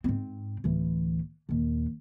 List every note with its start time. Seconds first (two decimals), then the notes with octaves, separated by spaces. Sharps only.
0.04 G#2 C4
0.64 D1 E3
1.49 D#1 D#2